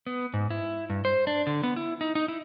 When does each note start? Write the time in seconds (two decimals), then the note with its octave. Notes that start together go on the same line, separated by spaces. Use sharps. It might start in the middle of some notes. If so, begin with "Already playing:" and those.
0.07 B3
0.33 G#2
0.51 E4
0.90 G2
1.05 C5
1.27 D4
1.47 D3
1.63 B3
1.76 E4
2.01 D#4
2.15 D#4
2.28 E4